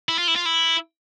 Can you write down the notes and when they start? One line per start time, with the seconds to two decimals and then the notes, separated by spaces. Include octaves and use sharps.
0.09 E4
0.18 F4
0.28 E4
0.36 F4
0.45 E4